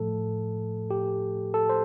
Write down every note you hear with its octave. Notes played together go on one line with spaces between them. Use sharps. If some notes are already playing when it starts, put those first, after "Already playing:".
Already playing: A2 F3 A3 A4
G4
A4
C5